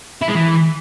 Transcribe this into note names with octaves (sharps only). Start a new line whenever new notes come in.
E4
G#3
E3